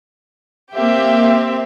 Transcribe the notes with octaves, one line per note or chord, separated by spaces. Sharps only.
A#3 C4 G4 E5